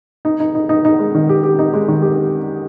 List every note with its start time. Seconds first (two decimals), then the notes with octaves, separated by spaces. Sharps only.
0.25 D#4
0.40 D#4
0.55 D#4
0.69 D#4
0.85 D#4
0.99 G#3
1.15 D#3
1.29 G4
1.43 G4
1.59 D#4
1.73 G#3
1.88 D#3
2.02 G4